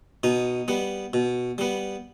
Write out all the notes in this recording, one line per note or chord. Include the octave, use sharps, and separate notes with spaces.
B2 D#4
G3 B3
B2
G3 B3